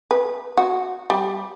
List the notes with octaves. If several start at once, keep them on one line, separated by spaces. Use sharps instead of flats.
B4
F#4
G3